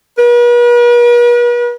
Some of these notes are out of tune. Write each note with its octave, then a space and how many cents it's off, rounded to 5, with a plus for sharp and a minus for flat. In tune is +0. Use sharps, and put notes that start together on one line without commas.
B4 -45